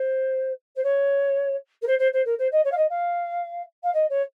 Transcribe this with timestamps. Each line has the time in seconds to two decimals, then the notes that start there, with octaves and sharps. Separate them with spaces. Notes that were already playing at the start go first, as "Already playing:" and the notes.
Already playing: C5
0.76 C5
0.83 C#5
1.82 A#4
1.87 C5
1.98 C5
2.12 C5
2.25 A#4
2.38 C5
2.51 D#5
2.64 C#5
2.71 F5
2.76 D#5
2.89 F5
3.83 F5
3.93 D#5
4.09 C#5